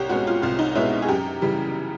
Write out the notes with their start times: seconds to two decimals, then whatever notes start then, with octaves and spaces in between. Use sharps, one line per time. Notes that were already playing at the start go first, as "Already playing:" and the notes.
Already playing: C2 G4 C#5
0.09 B2 G#3 C#4 F#4
0.27 F4
0.42 C2 F4
0.59 D#4
0.75 B2 G#3 C#4 E4
1.02 G#4
1.08 F#2 G4
1.42 C#3 E3 G3